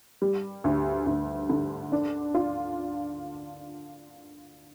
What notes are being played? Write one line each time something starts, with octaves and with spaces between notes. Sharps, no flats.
G3
D2
D2
D3
D4
F4